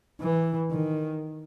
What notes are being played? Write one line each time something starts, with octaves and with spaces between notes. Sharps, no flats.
E3
D#3